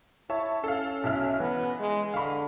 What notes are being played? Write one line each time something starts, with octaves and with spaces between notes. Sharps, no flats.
E4 C#5 E5 A5
C#4 A4 F5
B1 E4 F6
E3 B3
G#3
D3 F5 B5